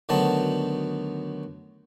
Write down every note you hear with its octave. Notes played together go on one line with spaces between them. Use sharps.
D2 D#3 F#3 B3 A5